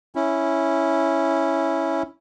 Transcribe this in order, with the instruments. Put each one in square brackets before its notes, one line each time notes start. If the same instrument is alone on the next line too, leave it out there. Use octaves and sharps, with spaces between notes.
[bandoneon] C#4 E4